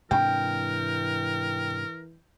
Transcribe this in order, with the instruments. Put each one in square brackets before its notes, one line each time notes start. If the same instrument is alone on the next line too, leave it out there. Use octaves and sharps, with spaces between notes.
[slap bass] G#2 C3 D4 [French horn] E3 [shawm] A#4 [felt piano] G5